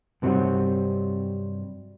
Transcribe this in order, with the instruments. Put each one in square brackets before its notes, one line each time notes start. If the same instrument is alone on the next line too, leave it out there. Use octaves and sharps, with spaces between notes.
[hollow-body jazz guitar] G2 C3 F#3 G3 D#4 F#4